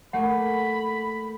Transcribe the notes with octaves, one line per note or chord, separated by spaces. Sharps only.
A3 A#3 F#5 B5